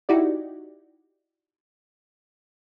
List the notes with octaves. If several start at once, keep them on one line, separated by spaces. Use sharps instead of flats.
D#4 E4 F#4 G4 D5